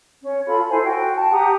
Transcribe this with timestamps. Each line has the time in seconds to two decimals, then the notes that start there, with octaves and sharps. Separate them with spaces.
0.22 C#4
0.46 F4 A4 B5
0.69 E4 A4 C5 G#5
0.84 F#4 G5
1.16 A5
1.31 G4 F#5 A#5 D#6